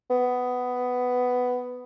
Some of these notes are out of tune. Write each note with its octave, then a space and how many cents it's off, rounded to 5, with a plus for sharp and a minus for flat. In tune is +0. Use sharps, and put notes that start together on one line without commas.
B3 +10